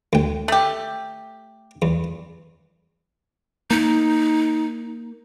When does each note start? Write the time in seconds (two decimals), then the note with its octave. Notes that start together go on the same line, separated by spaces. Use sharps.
0.13 D2 G5
0.48 A3 G4
1.82 E2
3.70 A#3 D#4